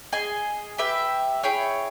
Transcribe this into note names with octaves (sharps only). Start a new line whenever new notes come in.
G#4 D#5 G#5
G4 B4 E5 G5
E4 G#4 C#5 G5